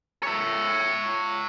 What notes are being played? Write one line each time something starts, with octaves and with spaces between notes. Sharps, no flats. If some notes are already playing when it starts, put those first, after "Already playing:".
C#5 E5